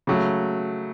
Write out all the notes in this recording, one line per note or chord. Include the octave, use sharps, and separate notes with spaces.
C#3 F#3 A3